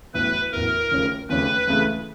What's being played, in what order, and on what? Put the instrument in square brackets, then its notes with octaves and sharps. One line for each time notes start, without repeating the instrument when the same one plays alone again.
[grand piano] A1 A2 F#3 B3 E4 [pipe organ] B4
[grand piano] A1 A2 F#3 B3 E4 [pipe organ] A#4
[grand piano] D#2 C#3 F3 A3 C#4
[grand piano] D#2 C#3 F3 A3 C#4 [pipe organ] B4
[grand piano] C#2 C#3 E3 A3